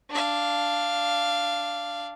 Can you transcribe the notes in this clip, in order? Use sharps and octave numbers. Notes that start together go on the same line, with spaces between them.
D4 F5